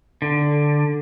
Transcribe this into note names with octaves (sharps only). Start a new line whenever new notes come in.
D3